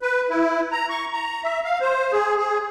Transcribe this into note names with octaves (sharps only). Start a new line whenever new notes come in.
B4
E4
A#5
C#6
A#5
E5
F5
C5
G#4
G#4